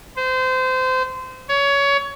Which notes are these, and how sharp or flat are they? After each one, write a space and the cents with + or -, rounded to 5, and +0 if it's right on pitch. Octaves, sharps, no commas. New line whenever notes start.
C5 -25
C#5 +20